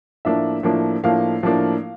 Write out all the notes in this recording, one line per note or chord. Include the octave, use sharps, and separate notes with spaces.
A2 F3 A#3 D4 E5
A2 F3 A#3 D4
A2 F3 A#3 D4 F5
A2 F3 A#3 D4